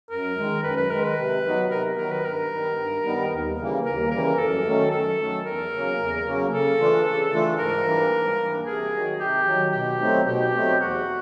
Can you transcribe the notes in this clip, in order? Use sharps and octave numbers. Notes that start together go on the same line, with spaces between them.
F#2 A#4
D#3 G#3
F#2 B4
B4
D#3 G#3 A#4
B4
C3
D#3 F#3 B3
C3 A#4
D#3 F#3 B3 A#4
B4
G2 A#4
D#3 G3 B3 D#4
G2
D#3 G3 B3 D#4
D#2
C#3 E3 G3 A#3
D#2 A#4
C#3 E3 G3 A#3 A#4
F#2 A4
D#3 F#3 A3 C#4
F#2 A4
D#3 F#3 A3 C#4
E2 A#4
C#3 F#3 A#3 C#4
E2
C#3 F#3 A#3 C#4
C#3 A4
E3 A3 D4 F4
C#3
E3 A3 D4 F4
G#2 A#4
E3 G3 A#3 D4
G#2
E3 G3 A#3 D4
C3 G#4
D#3 F#3
C3 G4
D#3 F#3
B2 G4
F#3 A3 C4 D#4
B2 G4
F#3 A3 C4 D#4
E2 F#4
C3